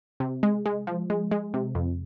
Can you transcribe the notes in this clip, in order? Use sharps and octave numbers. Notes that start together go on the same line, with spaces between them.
C3
G#3
G#3
F3
G#3
G#3
C3
F2